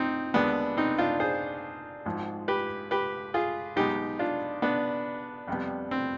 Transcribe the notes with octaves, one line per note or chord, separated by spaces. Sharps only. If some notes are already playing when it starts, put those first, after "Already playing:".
Already playing: C4 D#4
D#2 D3 G#3 B3 D4
C4 D#4
D4 F4
G#4 C5
G#1 G#2 F3
G4 B4
G4 B4
F4 G#4
B1 B2 G#3 B3 D#4 G4
D4 F4
B3 D4
F2 C3 G3 B3
C4